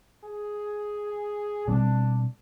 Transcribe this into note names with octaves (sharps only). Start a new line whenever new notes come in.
G#4
B2 G3 C4 D4